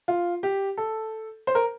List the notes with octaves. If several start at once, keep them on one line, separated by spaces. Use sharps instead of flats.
F4
G4
A4
C5
A#4